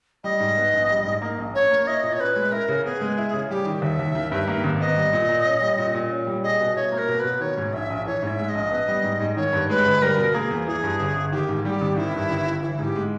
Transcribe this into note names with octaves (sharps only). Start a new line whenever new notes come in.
G3 D#5
G#2
B3
A#1
G3
G#2
A#3
A#1
C#4 C#5
A#3
E4 D#5
A#2
C#5
C#4 B4
G#3
E4 A#4
C#3
B3 G#4
G#3
E4
C#3
G3 G4
D#3
D#2 E5
D#2
D#3
G2
A#3
G#1
B3 D#5
G3
A#2
A#2
C#4
G3
A#2
A#2
C#4
G3
G#4 D#5
B2
E4 C#5
A#3
A#4
B2
B2 B4
D#3 C#5
G#2
A#1 E5
A#1
E3 C#5
G#2
E5
G#3
D#5
A#1
B3
G3
G#2
G#2
D#3 C#5
G2
G#3 B4
G1
G3 A#4
B2
A#3 G#4
E2
E3 G#4
G2
G1
G1
D#3 G4
G#2
G3 G4
G#1
D#3 E4
G2
G1
G1
E3 E4
G#2
G4
G#3